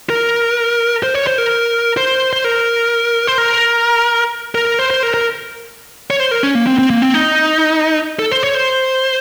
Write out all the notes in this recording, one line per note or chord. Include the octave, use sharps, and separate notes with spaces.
A#4
C5
C#5
C5
A#4
C5
C5
A#4
C5
A#4
A#4
C5
C5
A#4
A#4
C#5
C5
A#4
C#4
A#3
C4
C4
A#3
C4
D#4
A4
C5
C#5
C5